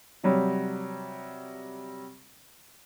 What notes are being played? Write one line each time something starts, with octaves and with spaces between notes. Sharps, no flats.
C3 F#3 G3